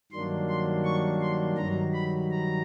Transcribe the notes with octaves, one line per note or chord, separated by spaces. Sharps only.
G2 D#3 F#3 A#3 D4 C6
C6
C#6
C6
G2 D#3 F#3 A#5
B5
A#5